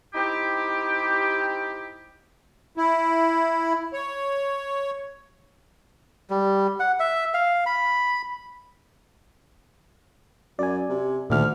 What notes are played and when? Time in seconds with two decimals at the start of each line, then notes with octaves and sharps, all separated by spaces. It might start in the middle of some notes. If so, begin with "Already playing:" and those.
0.14 C4 D#4 E4 G4
2.77 E4
3.93 C#5
6.30 G3
6.80 F#5
7.00 E5
7.34 F5
7.66 B5
10.59 F#2 D5 G#5
10.89 C3
11.30 D2 A#2 D#3 F6